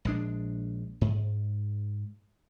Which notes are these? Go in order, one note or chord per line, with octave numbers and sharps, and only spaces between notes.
A#1 G#3 D4
G#2